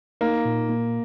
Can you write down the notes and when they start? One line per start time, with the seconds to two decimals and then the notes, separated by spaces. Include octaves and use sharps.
0.21 A#3 D#4
0.45 A#2
0.70 A#3